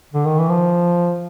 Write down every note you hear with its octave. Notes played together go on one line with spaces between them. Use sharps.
D3
D#3
E3
F3